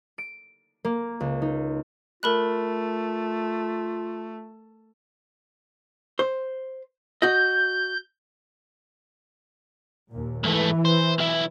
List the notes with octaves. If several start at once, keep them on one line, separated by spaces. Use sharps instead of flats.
D7
A#3
C#2
D#4
A3 F4 A#4 B5 F#6
C5
F#4 D#5 G6
D#2 A#2
G#2 E3 A3
C5
B1 E4